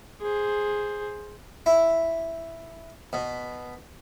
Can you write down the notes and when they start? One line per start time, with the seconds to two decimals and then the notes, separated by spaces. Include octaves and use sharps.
0.21 G#4 C5
1.66 E4
3.13 B2